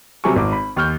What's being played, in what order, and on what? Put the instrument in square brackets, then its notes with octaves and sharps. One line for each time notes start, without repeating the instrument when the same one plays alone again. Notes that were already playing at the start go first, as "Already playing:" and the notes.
[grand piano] C3 F#3 G3 G#5 C#6
G#1 D6
B5
D#2 C#6 F6 G6